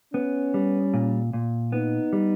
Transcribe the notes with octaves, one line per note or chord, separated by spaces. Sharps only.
B3 C#4
G3
A#2
A#2
B3 D#4
G3